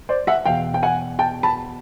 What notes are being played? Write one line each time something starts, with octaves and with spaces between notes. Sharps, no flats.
C5 D5
E5 F#5
E2 B2 F5 G5
G5
F#5 G#5
G5 A5
A5 B5